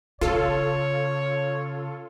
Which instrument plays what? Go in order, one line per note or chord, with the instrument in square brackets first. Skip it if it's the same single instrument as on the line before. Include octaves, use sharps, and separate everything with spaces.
[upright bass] C#3 [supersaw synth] F4 A4 [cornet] C#5